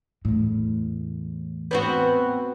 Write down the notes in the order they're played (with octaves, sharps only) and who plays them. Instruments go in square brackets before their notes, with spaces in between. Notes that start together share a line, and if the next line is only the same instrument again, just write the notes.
[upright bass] E2 A2
[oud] B3 C4 F#4